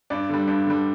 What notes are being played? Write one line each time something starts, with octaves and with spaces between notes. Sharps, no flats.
G2 D5
D3 G3
G2
D3 G3